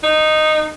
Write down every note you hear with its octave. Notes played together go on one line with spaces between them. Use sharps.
D#4